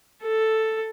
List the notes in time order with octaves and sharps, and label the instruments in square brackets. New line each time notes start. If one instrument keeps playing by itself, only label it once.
[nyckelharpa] A4